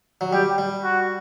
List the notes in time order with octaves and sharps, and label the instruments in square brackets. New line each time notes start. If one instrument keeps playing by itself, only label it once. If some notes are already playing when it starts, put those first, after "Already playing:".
[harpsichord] F#3
[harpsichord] G3 [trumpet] G4
[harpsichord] G3
[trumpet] F#4